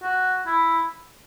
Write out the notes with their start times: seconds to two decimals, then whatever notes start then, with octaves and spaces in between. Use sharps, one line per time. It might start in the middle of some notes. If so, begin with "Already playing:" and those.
0.03 F#4
0.46 E4